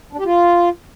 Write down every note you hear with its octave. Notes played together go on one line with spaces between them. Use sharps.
D4
G4
F4